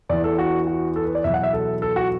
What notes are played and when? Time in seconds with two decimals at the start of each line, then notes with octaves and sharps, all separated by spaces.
0.09 E2 E3 D5
0.24 A4
0.38 F#4
0.67 F#4
0.96 A4
1.05 B4
1.15 D5
1.24 E2 B2 F#3 E5
1.34 F#5
1.43 E5
1.53 A4
1.82 A4
1.96 F#4